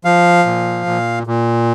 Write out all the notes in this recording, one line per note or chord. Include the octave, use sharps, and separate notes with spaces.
F3 F5
A#2
A#2
A#2